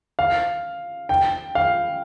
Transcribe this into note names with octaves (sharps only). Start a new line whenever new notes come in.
F5
G5
F5